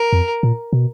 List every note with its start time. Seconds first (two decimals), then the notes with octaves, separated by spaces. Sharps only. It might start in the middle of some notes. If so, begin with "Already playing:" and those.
Already playing: A#4
0.13 F2
0.43 A#2
0.73 B2